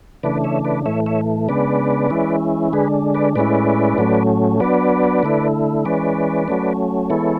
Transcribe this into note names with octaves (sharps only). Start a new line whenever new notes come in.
C#3 E3 A3 D4 B4 D5
C#5 E5
B4 D5
A2 E3 A3 C#5 E5
C#5 E5
C#3 G#3 B3 D4 B4 D5
E3 G#3 C#4 E4
D3 G#3 D4 G#4 B4
B4 D5
A2 G#3 C#4 E4 B4 D5
A2 F#3 A3 C#4
F#3 B3 D4 B4 D5
D3 A3 E4
E3 G#3 C#4 B4 D5
F#3 A3 C#4
E3 G#3 B3 E4 A4 C#5